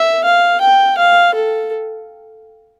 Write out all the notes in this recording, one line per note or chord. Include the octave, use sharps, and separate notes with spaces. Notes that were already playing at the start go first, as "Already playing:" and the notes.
Already playing: E5
F5
G5
F5
A4